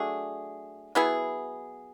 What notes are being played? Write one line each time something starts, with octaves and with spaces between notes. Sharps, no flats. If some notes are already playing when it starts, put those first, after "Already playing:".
Already playing: F#3 A3 D4 G#4
F#3 B3 E4 G#4